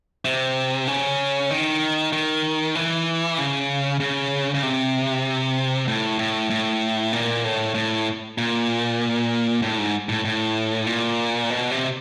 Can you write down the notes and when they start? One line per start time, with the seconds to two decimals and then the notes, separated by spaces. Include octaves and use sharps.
0.25 C3
0.88 C#3
1.50 D#3
2.13 D#3
2.75 E3
3.38 C#3
4.00 C#3
4.54 C#3
4.63 C3
5.88 A2
6.19 A2
6.50 A2
7.13 A#2
7.44 A2
7.75 A2
8.38 A#2
9.62 A2
9.78 G#2
10.09 A2
10.25 A2
10.87 A#2
11.50 B2
11.71 C3